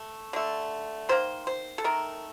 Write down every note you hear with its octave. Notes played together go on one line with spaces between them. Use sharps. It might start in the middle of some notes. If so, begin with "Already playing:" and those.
Already playing: A3
D3 A3
D#3 A#3 C5
C5
A4
D#3 A3 A#4